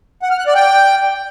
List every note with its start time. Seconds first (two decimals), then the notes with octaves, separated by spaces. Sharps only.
0.22 F#5
0.30 F6
0.38 F#6
0.47 D5
0.55 G5